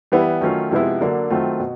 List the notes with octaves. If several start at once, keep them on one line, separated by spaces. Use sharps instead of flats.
E3 G3 B3 E4
D#3 F#3 A3 C#4 F4
C3 F3 G#3 B3 E4
D3 F#3 A#3 D4
D#3 F#3 A3 C4 F4
B2